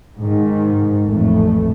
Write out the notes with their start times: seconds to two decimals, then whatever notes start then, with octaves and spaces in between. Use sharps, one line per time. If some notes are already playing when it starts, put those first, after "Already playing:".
0.18 G#2 D#3
1.05 A1 F2 A3